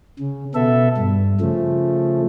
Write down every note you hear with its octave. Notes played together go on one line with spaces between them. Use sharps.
C#3
B2 B3 A4 E5
G2
C#3 F3 A3